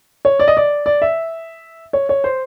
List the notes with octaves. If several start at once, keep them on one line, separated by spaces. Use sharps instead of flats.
C#5
D5
D#5
D5
D5
E5
C#5
C#5
C5